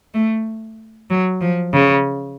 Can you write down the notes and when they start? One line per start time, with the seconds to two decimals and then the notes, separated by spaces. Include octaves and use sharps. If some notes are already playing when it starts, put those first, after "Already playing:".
0.14 A3
1.10 F#3
1.41 F3
1.73 C#3